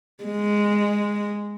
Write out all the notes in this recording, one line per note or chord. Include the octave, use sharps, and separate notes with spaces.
G#3